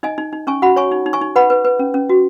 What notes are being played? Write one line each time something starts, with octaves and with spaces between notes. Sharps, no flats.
D#4 D#5 G#5
D#4
D#4
C#4 G#5 C#6
F#4 F#5 B5
C#5 G#5 C#6
D#4
D#4
G#5 C#6
D#4
B4 F#5 B5
B4
B4
C#4
C#4
F#4